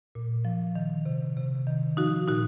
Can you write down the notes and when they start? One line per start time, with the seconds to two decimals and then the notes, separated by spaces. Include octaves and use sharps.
0.15 A#2
0.45 F3
0.75 D#3
1.05 C3
1.37 C3
1.67 D#3
1.97 F3 D#4 F#4
2.28 A#2 D#4 F#4